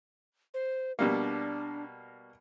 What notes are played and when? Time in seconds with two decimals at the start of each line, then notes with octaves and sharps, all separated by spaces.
0.54 C5
0.99 B2 G3 A#3 D4